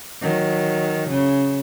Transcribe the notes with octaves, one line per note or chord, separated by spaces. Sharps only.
D#3 F#3
C#3